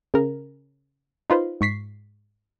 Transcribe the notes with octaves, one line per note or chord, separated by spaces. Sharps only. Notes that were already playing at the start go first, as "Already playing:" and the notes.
C#3 A#4
D#4 F4 B4 C5
G#2 C#6 B6 C7